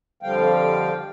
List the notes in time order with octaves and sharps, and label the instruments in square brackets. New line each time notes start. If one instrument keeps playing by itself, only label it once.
[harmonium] F2 D3 F3 G3 F5 G5